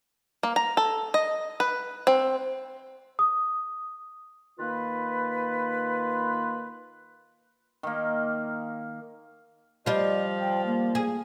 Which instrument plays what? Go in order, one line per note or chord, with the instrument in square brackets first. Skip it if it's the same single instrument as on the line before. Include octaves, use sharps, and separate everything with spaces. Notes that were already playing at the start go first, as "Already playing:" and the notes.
[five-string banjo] A#3
A#5
A4
D#5
B4
C4
[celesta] D#6
[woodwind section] D#3 A#3 F4 B4
[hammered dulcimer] D#3 A#3
[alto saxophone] F3 [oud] G3 F4 [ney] D#5
[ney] G5
A#3
[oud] G#4